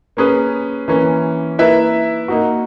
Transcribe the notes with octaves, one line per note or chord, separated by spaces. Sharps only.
A#3 C#4 G#4 B4
E3 A#3 C#4
A#3 E4 B4 E5
A#3 D#4 F#4